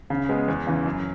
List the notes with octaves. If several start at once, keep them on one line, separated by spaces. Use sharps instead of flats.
C#3
G#3 B3
E2
C#3 E3
F#2